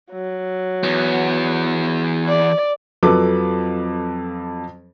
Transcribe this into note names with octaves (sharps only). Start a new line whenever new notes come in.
F#3
E2 B3
D5
F2 F3 F#3 A4 B4 D6